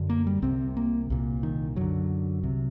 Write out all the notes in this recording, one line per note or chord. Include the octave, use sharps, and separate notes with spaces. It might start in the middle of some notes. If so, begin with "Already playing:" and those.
Already playing: F#2 D3
A#3
G3
C2 C3 C4
A#3
C2 A#2
D#3
F#2 D3 F#3
C2 C3